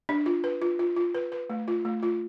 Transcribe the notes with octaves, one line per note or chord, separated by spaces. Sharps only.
D4
F4
B4
F4
F4
F4
B4
B4
A3
F4
A3
F4